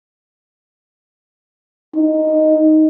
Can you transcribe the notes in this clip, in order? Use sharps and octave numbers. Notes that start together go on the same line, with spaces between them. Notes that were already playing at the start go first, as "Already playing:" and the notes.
D#4